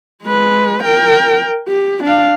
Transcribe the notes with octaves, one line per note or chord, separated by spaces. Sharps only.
G#3 B4
A#4 G5
G4
D4 F5